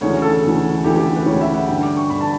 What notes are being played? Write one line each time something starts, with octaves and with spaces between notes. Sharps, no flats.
D2 C#3 E3 C#5
A4
D2 C#3 E3
D2 C#3 E3 G4
G4
B4
D2 C#3 E3 C#5
E5
F#5
G2 D3 G5
D6
C#6
G2 D3 B5
A5